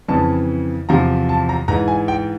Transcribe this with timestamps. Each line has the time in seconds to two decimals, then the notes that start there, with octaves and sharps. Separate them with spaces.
0.08 F2 C#3 E3 A5
0.89 E2 C3 F3 A#5
1.29 A5
1.49 A#5
1.68 G#2 E3 A#5
1.88 G#5
2.08 G5